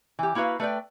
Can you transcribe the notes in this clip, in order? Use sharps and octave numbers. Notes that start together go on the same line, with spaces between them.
E3 G4
A#3 E4 F#4 B4 F5
A3 B4 D5 G5